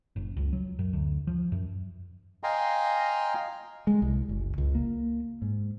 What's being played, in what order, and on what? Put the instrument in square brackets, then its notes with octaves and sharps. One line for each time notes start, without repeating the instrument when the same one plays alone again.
[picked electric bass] F#1
C#2
F#3
F#2
D2
F3
F#2
[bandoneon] D#5 F5 G5 G#5 A#5 C6
[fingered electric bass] G#3
C2
F#1
C#2
A#3
G#2